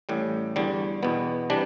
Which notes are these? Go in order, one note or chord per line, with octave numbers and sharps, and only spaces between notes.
A1 A2 G3
E2 D3 G3
E2 B2 B3
C3 E3 G3 D4